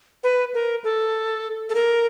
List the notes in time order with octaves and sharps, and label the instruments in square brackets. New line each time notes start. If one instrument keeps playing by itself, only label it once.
[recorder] B4
A#4
A4
A4
A#4